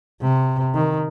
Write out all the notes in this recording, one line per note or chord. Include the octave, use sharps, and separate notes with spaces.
C3
D#3